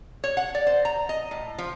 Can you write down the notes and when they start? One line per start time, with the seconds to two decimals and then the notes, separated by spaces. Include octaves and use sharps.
0.24 C#5
0.37 F#5
0.55 D5
0.67 C5
0.85 A#5
1.09 D#5
1.31 A2
1.58 F3